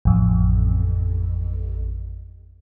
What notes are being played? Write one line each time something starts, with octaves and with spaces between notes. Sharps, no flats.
A1 F2